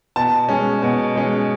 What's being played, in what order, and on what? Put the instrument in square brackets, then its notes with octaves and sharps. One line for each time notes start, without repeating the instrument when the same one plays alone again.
[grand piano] B2 A5
G#3 C#4
B2
G#3 C#4